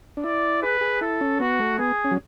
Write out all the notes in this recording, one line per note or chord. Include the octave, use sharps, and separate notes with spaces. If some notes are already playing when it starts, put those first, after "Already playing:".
D4
E4 D5
G#4 B4
G#4
E4 A4
C#4
B3 F#4
A3
B3 G#4
C#4
F#3